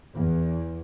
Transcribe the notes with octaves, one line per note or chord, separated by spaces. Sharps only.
E2